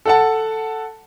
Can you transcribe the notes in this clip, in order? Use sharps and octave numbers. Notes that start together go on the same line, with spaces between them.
A4 F#5 A5